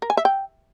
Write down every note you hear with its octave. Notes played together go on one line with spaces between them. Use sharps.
A#4
G#5
E5
G5